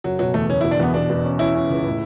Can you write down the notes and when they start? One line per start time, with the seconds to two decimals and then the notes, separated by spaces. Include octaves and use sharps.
0.04 F#1 F#3
0.19 B2 F#3
0.34 E2 A3
0.50 F#1 C#4
0.61 E4
0.64 B2
0.71 D4
0.80 E2 B3
0.94 B2 D4
1.10 B2
1.25 C#4
1.39 C#4 E4
1.55 C#4
1.70 C#2
1.85 A2